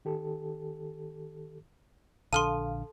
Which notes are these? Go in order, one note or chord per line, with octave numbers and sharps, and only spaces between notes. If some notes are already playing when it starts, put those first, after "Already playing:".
D#3 G4 A4
A#1 D3 A4 F5 A5 C6 F6 D#7